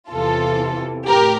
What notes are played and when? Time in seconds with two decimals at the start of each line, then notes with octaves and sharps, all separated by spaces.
0.10 E2 C3 E3 F4 A4
1.07 A2 G4 A#4